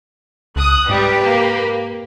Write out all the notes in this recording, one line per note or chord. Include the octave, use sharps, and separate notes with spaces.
C#2 D#6 F#6
G#2 C3 G3 G4 B4
A#3